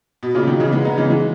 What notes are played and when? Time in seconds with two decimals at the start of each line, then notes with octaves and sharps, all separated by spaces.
0.23 B2
0.35 A#2 C#3
0.47 B2 D#3
0.60 C#3 E3
0.72 G#3 B3
0.85 B3 D#4
0.98 C#3 E3
1.10 E3 G#3